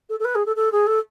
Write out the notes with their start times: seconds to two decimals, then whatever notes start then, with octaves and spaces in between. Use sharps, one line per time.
0.09 A4
0.19 A4
0.24 B4
0.35 G#4
0.46 A4
0.56 A4
0.72 G#4
0.87 A4